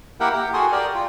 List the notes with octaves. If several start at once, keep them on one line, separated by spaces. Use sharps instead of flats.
A#3 E4 G4 A#4 F#5 G5
G4 G5
F#4 G#4 A4 C6 D#6
G4 A#4 D5 G5
F4